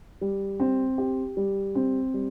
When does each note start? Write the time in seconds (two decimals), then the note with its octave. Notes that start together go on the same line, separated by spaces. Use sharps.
0.21 G3
0.60 C4
0.98 G4
1.37 G3
1.75 C4
2.14 G3